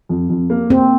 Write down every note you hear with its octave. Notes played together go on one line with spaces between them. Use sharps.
F2
F2
A#3
A#3 C4